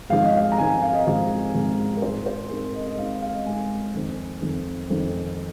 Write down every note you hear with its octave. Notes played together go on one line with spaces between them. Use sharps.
G#1 G#2 F3 G#3 C4 F5
D#5
F5
A#5
G#1 G#2 F3 G#3 C4 G#5
F5
D#5
G#1 G#2 F3 G#3 C4 F5
G#1 G#2 F3 G#3 C4
A#4
G#2 G#3 C4 C5
C5
G#2 G#3 C4 A#4
D#5
D#5
G#2 G#3 C4 F5
F5
D#5
G#2 G#3 C4 G#5
F2 D#3 C4
F2 D#3 C4
F2 D#3 C4